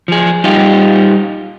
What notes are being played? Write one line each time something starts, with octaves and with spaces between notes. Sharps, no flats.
F3 G#4
G3 D#4 F4 G4